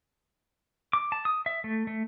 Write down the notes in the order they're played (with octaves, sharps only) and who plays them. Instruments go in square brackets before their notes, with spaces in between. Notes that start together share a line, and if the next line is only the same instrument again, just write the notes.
[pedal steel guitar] D6
A5
D#6
E5
A3
A3